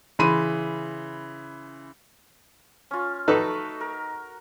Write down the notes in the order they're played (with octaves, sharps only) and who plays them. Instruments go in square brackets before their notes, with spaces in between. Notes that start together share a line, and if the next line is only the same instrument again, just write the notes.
[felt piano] C#3 E3 B5 C6 D#7
[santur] C#4 F4
[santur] A3 F#4 D6 [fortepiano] D#4 A4 B4
[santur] A#4